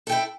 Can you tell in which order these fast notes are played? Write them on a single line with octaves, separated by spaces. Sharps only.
A4 G5 E4